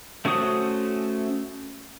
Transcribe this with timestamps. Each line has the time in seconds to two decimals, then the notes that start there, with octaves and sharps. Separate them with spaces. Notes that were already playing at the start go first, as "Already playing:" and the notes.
0.25 A3 C#4 F#4 C5 D#6